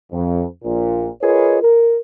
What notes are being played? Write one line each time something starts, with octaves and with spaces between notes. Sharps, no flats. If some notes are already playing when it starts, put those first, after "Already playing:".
F2
A#1 A#2
F4 G#4 A#4 B4 C#5 D#5
A#4